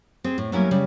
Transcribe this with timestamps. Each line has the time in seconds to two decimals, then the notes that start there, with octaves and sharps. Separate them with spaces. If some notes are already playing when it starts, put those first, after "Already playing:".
0.24 C4 G#4
0.38 A2
0.52 F#3 G3 A#3 B3 C#4 E4
0.71 C#3 G3